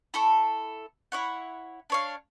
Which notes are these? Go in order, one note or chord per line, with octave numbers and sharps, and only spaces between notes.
E4 A4 C#6
E4 C#5 F#5
D4 C#5 F5